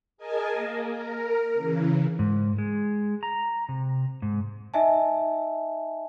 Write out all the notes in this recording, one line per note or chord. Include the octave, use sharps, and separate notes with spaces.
G#4 A#4 D#5 G#5 A5
A#3
A#4
C#3 E3
G#2
G#3
A#5
C3
G#2
D#4 D#5 E5 G#5 A5